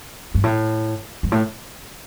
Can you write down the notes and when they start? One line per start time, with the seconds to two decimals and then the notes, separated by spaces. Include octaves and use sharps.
0.34 G2
0.44 A2
1.23 G2
1.32 A2